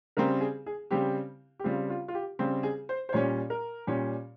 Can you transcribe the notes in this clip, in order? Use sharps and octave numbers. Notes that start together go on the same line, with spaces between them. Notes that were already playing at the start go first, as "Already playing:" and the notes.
C#3 G3 C4 A#4
G#4
G#4
C#3 G3 C4 G4
G4
C#3 G3 C4 F4
F4
F4
G4
C#3 G3 C4
G#4
C5
C5
A#2 G3 C#4 C#5
A#4
A#2 G3 C#4